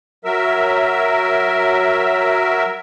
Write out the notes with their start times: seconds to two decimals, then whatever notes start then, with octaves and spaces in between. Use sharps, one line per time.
0.25 F#3 A#4 E5